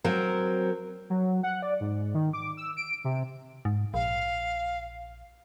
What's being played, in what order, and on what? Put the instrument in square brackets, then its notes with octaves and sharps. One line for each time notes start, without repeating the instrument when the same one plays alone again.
[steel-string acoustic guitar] F#3 C4 A#4
[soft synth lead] F#3
F#5
D5
G#2
D#3
D6
E6
D7
C3
[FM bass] G#2
[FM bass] A#1 [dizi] F5